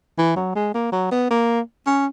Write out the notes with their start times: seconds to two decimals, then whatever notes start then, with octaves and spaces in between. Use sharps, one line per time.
0.18 E3
0.36 F#3
0.55 G#3
0.74 A#3
0.92 F#3
1.12 B3
1.31 A#3
1.87 C#4